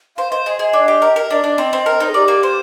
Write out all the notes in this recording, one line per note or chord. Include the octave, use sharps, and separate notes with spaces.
C5 F5
C5 D#5
G#4 D#5
G#4 D#5
D4
G4
A#4
A#4
D4 D#5
D4
C4
C4
A#4
D#4
G#4
G4 D5
A#3
C5